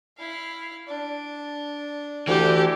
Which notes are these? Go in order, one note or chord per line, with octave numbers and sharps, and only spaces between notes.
E4 F5
D4
D2 E3 G4